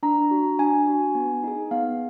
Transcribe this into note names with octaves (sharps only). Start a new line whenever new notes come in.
D4 A#5
F#4
D4 G#5
F#4
B3
D#4 G#4
B3 F5